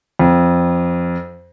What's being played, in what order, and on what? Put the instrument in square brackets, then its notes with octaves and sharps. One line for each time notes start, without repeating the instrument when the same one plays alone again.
[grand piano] F2